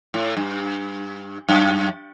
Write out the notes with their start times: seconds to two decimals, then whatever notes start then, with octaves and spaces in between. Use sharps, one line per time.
0.14 A2
0.37 G2
1.49 F#2